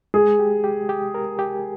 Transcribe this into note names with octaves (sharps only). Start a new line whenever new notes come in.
G#3 G#4
G4
G4
G4
A#4
G4